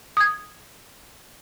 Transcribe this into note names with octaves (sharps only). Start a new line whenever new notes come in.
D#6 G#6